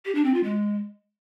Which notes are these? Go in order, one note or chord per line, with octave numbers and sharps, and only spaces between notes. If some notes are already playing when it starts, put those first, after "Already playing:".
G4
D4
C4
F4
G#3